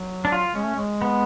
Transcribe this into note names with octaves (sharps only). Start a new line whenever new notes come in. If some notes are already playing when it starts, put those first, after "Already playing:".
Already playing: F#3
D4
F4
G#3 C#4
A3
G#3
B3